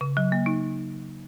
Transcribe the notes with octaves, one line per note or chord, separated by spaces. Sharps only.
C#3
F#3
A#3
D#4